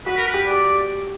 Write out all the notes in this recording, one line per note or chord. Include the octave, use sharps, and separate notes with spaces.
F#4 B4
A#4
B4
G4
G4 D5